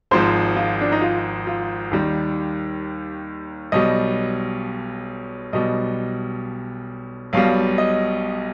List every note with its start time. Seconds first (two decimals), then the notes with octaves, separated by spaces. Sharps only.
0.11 G#1 G#2 F3 C5
0.56 F4
0.81 D4
0.92 D#4
1.01 F4
1.47 F4
1.91 D#2 D#3 G3
3.72 B1 B2 G3 D#5
5.53 B1 B2 G3 D#5
7.33 B1 B2 G3 F5
7.78 D#5